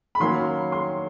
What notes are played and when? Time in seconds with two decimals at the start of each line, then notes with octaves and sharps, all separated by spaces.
0.15 B5
0.20 D#3 F#3 A#3 C#4 C6
0.72 C6